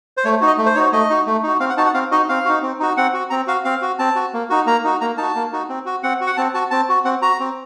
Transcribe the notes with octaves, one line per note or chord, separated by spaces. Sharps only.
C5
A3 C#5
D#4 F#4
D#5
A3
C5
D#4 F#4 C#5
A3 D#5
D#4 F#4
A3
D#4 F#4
C4 F5
F#5
D#4 F#4 A5
F#5
C4 F5
D#4 F#4 D#5
C4 F5
D#4 F#4
C4
D#4 F#4
C4 F#5
F#4
C4 A#5
F#4 F5
C4 F5
F#4
C4 A5
F#4
A#3
D#4 F#4
A#3 A#5
D#4 F#4
A#3 A#5
D#4 F#4 A5
A#3
D#4 F#4
C4
F#4
C4 F#5
F#4
F#5
C4 A5
F#4 A5
C4 A5
F#4
C4 F#5
F#4 A#5
C4